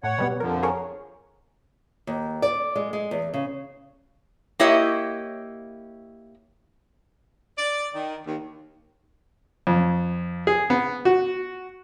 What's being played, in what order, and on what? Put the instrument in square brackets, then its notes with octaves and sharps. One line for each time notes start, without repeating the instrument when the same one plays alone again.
[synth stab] A2 [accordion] C#5 F#5
[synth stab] B2 G3 B3
[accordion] F2 D3 F3 [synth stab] A#4
[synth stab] G#4 A#4 C#5
[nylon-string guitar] D#2
D5
G#3
G#3
E2
C#3
[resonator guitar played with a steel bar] A#3 E4 G4 C#5 D#5
[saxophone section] D5
D#3
D#2
[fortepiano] F2
G#4
B3
F#4